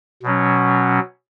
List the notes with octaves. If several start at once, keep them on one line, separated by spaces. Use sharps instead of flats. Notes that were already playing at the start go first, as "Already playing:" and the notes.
B2 F#3 C#4